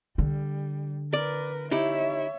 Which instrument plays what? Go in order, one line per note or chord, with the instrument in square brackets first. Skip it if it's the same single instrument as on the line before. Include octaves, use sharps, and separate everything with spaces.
[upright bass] D3 [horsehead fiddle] G3
[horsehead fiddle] A#4 B4 [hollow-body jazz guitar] D5
[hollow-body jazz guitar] D#4 E4 G4 [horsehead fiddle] C#5 E5